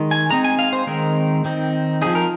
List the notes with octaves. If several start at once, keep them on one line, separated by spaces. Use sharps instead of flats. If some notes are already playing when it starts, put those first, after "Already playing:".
Already playing: D#3 G#3 D#4
G#5
G#3 C4 D#4 A#5
G#5
F5
C5
D#3 G#3 C4 D#4 A#4
D#3 C4 D#4
F3 C4 D#4 G#4
A#4